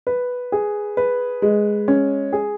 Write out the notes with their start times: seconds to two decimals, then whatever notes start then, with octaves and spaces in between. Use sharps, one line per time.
0.07 B4
0.52 G#4
0.97 B4
1.42 G#3
1.88 C#4
2.33 G#4